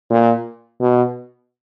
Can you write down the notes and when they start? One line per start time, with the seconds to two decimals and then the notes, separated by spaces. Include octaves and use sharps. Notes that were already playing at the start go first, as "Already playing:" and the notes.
0.10 A#2
0.81 B2